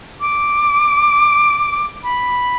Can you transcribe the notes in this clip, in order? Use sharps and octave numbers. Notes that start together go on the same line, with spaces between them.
D6
B5